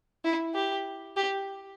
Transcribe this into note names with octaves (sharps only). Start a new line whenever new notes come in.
E4
G4
G4